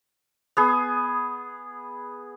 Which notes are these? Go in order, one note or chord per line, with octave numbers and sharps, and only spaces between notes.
B3 G#4